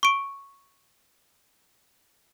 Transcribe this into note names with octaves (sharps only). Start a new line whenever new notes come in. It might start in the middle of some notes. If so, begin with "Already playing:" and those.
C#6 D7